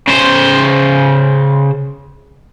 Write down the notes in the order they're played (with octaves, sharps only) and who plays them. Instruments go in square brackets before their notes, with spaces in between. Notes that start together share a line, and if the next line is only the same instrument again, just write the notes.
[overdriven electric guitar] C#3 C5